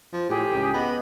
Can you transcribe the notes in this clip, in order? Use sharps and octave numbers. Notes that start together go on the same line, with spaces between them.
F3
A2 G4 G#4 G5
C#2
B3 B4 D#5 B5